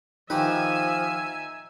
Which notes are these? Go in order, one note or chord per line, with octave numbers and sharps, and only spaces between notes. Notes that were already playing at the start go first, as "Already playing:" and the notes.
D#3 F3 D#4 G4 B4 E5 G#5